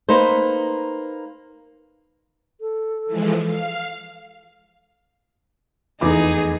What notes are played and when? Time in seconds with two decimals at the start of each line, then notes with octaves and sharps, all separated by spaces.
0.09 A#3 D#4 B4 C5
2.61 A4
3.06 E3 F3 G#3
3.44 F5
6.01 F1 E2 D#4 G#4 D6